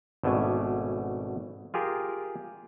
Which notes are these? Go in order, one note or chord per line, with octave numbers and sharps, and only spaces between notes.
G#1 B2 A3 D4 G#5
F4 G4 G#4 A#4